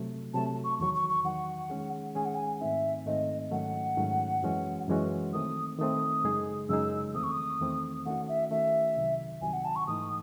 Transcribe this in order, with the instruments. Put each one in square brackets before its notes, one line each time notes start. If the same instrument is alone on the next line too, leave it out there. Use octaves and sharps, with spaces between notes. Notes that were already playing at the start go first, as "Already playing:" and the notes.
Already playing: [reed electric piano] C3 F#3 A3
[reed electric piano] C3 F#3 A3 [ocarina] A5
[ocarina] C#6
[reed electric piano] E2 D#3 F#3 [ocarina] C#6
[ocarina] C#6
C#6
[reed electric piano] E2 D#3 F#3 [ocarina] F#5
[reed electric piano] D#3 G#3 C#4 G#4
[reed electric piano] D#3 G#3 C#4 G#4 [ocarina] G#5
[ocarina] F#5
G#5
[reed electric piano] G#2 D#3 A3 C4 D#4 [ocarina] E5
[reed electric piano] G#2 D#3 A3 C4 D#4 [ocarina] D#5
[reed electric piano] G#2 D#3 F#3 A3 C#4 [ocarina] F#5
[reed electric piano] G#2 D#3 F#3 A3 C#4
F#2 E3 G#3 C#4 F#4
F#2 E3 G#3 C#4 F#4
[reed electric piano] D#3 A3 C4 [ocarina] D#6
[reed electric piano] D#3 A3 C4 [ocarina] D#6
[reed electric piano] F#2 C#3 G#3 D#4 G#4
[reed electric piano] F#2 C#3 G#3 D#4 G#4 [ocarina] E6
[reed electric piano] E2 D#3 A3 C4 [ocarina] D#6
[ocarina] C#6
D#6
[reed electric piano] E2 D#3 A3 C4
[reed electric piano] D#3 A3 C#4 F#4 [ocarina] F#5
[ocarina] E5
[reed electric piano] D#3 A3 C#4 F#4 [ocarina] E5
[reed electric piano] C2 C3 D#3 F#3
[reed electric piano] C2 C3 D#3 F#3 [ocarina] G#5
[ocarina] F#5
A5
C#6
[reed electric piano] G#2 E3 A3 D#4 [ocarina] D#6